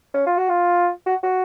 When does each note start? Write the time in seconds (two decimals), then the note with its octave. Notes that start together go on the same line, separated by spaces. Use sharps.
0.14 C#4
0.26 F4
0.38 F#4
0.49 F4
1.06 F#4
1.23 F#4